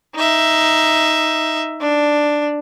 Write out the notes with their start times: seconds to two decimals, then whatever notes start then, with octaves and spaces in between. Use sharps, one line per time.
0.15 D#4 E5
1.81 D4